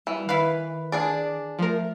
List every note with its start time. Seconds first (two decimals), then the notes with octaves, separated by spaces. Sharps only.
0.07 E3 G3
0.29 D#3 E4 B4 F5
0.92 D4 G#4 D5
1.59 F3 A3 A#4